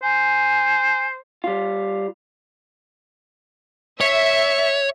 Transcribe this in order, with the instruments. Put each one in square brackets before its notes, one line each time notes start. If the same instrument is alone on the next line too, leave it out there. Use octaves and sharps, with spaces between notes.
[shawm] C5 [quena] G#5
[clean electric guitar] G3 F4
[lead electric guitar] C#5 [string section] E5